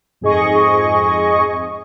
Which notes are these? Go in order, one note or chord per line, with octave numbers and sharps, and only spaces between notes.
F2 G#2 G#4 D#5 C#6